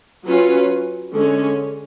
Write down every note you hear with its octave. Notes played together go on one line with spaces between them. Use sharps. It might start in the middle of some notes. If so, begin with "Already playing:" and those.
F#3 C#4 F4 B4
D3 G#3 C#4